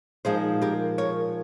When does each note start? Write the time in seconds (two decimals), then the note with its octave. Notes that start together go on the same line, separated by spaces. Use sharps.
0.25 A#2 F3 G#3 D#4 G#4 C5
0.62 G4 A#4
0.98 A#4 C#5